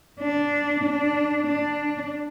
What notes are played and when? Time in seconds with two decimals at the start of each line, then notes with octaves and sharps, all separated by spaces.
0.20 D4
0.83 D4
1.46 D4